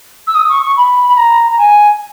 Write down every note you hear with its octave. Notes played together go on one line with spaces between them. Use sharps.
E6
D#6
C#6
C#6
B5
B5
A#5
A#5
G#5